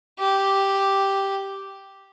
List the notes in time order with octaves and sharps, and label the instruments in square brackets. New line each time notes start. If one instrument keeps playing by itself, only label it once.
[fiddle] G4